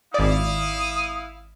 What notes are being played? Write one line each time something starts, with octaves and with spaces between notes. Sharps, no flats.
G#1 E4 D5 F5 D#6